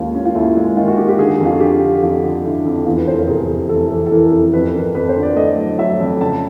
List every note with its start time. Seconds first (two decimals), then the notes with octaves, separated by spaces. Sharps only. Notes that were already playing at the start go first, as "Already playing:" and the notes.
Already playing: D#2 G#3 C#4 F4
0.15 C#4
0.25 F4
0.35 D#2 E4
0.57 G#3
0.77 D#3 F4
0.88 F#4
0.97 D#3 G4
1.08 G4
1.18 D3 G#4
1.39 F2
1.45 F4
1.52 F#4
1.60 D3 G4
1.81 D3
2.03 F2 F4
2.23 D3
2.45 D3 E4
2.65 F2
2.85 E2 F4
2.96 B4
3.08 F1 C5
3.18 A#4
3.28 C3 G#4
3.49 F1
3.69 E3 A4
3.91 E3
4.06 A4
4.12 E3 A#4
4.32 F1
4.53 F2 B4
4.75 F2 A#4
4.95 F2 B4
5.09 C5
5.16 D3
5.23 D5
5.37 A3 D#5
5.58 F#3
5.78 F#3 E5
6.00 F2
6.21 C#3 A5